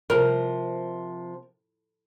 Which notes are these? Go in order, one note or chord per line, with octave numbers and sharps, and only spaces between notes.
C3 F3 A#4